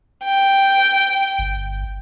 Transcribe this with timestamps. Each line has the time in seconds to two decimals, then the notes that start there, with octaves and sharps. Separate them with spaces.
0.25 G5
1.39 G1